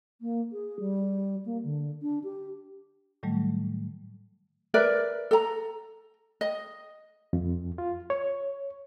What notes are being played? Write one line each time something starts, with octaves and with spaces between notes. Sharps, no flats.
A#3
G#4
G3
A#3
D3
D4
G4
A2 D#3 F#3 G3 A3
A#4 B4 D5 E5
A4 A#5
D#5
F2
F4
C#5